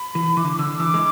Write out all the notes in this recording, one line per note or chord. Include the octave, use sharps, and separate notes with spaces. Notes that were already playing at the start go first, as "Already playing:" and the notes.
Already playing: B5
E3
E3 D6
D3
D6
D3 E6
E3 D6
G#3